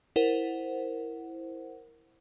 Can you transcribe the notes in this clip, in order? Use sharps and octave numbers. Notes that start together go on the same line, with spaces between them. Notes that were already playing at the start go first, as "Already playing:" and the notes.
E4 A#4 C5 F#5